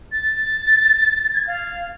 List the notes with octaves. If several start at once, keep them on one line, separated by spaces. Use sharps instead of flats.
A6
G#6
F5